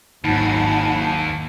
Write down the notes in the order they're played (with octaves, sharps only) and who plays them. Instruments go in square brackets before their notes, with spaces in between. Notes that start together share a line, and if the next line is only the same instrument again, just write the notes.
[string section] G#1 F#3 G#5 [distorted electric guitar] D#2 [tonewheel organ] D#4 F#5 B5 [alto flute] A5